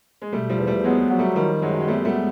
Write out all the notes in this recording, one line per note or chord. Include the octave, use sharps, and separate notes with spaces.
G#3
B2 G3 A3
F3 G3
E2
G3 A3
F#3 G#3 B3
F#3
G3 A3
D#3 F3 G3
F#2 F#3 G#3
G#3
G3 A3 B3
G3 A3
G#3